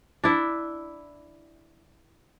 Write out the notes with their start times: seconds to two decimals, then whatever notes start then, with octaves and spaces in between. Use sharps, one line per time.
0.24 D4 E4